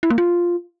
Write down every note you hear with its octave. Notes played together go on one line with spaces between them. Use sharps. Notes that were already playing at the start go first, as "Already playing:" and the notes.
E4
A#3
F4